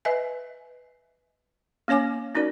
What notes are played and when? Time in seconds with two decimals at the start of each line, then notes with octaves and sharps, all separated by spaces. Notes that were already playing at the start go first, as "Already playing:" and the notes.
0.05 B4 D#5 E5 G#5
1.88 A#3 C#4 C#5 G#5 D6
2.35 C#4 D#4 F#4 A#4 D5